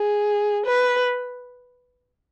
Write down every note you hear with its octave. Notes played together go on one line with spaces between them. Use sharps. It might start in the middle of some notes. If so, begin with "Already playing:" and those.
Already playing: G#4
B4